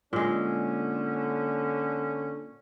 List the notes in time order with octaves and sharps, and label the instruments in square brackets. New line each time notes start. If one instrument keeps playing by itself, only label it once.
[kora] A#2 G#3 [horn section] D3 C#4